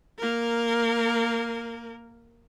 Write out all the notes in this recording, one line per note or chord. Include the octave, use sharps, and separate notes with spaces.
A#3 A#4